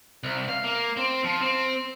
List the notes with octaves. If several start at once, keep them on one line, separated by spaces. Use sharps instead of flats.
C2
F5
A#3
C4
F3
C4